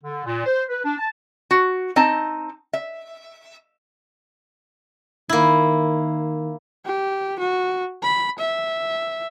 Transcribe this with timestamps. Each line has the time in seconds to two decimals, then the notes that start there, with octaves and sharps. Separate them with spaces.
0.04 D3
0.25 A#2
0.46 C5
0.69 B4
0.84 D4
0.98 A5
1.51 F#4
1.96 C4 D#4 A5
2.73 E5
5.29 D#3 A#3 E4
6.85 G4
7.39 F#4
8.03 B5
8.38 E5